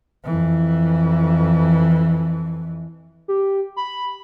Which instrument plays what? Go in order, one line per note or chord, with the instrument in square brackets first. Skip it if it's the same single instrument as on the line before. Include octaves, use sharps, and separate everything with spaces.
[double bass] F2 E3
[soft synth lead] G4
B5